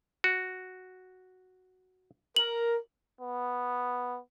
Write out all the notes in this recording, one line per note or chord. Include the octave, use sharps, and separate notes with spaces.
F#4
A#4 F#7
B3